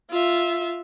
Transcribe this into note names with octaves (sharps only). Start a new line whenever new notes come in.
F4 E5